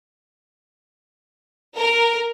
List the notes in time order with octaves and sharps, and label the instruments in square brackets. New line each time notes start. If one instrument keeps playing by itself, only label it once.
[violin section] A#4